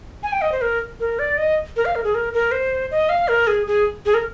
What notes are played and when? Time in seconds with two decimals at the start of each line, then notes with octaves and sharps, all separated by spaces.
0.23 G#5
0.32 G5
0.41 D#5
0.52 C5
0.61 A#4
1.00 A#4
1.19 D5
1.38 D#5
1.76 A#4
1.85 F5
1.95 A#4
2.04 G#4
2.15 A#4
2.34 A#4
2.52 C5
2.91 D#5
3.09 F5
3.28 A#4
3.47 G#4
3.67 G#4
4.06 G#4
4.14 A#4